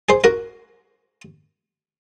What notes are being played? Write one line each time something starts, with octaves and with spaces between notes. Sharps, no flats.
G#4 C5
F#4 A#4